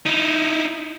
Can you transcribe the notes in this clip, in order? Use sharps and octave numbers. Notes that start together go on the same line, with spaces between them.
D#4 E4